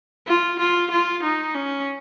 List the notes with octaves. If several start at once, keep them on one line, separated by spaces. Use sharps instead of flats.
F4
F4
F4
D#4
C#4